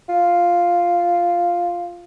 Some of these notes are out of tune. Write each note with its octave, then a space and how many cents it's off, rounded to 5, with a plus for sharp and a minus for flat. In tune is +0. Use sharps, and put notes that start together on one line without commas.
F4 +0